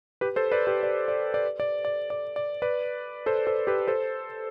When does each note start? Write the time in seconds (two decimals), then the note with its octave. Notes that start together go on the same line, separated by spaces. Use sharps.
0.21 G4 B4
0.36 A4 C5
0.52 B4 D5
0.67 G4 B4
0.83 D5
1.08 D5
1.34 D5
1.60 D5
1.85 D5
2.10 D5
2.36 D5
2.62 B4 D5
3.26 A4 C5
3.47 A4 C5
3.67 G4 B4
3.87 A4 C5